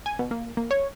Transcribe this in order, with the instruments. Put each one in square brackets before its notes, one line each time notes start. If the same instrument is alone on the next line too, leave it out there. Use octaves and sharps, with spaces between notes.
[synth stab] G#5
B2
A#3
A#3
C#5